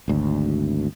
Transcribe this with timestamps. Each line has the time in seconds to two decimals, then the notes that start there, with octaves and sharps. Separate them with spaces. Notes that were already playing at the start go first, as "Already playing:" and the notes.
0.08 G#1 D2